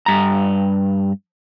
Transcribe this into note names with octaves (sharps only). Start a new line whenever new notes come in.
G2 A#5